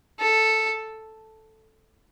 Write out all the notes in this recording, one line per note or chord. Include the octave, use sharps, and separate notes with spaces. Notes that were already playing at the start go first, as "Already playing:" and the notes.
A4